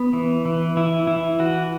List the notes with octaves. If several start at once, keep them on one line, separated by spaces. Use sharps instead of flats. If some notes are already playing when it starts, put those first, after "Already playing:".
Already playing: B3
E3
E3
E3 E4
E3 E4
E3 F#4